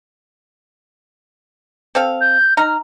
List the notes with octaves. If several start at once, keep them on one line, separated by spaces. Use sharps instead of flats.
C4 A4 F5
G6
D#4 A#5 F6